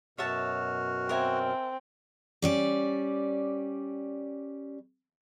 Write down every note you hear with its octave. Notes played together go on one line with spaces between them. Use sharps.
F#2 B2 F#4 C#5 E5 A5 F6
C4 A#4 E5 G#5
G3 C#4 D5